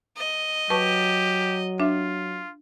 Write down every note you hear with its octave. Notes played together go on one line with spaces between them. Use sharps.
D#5
F#3 G4 B4 A5 C#6
D4 F4 E5